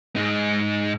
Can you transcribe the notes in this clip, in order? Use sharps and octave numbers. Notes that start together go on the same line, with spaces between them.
G#2 D#4